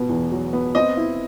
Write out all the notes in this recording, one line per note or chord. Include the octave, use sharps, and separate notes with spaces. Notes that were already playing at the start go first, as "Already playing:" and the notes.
Already playing: B2 B3
E2
F#3
B3
C4 D#5
E4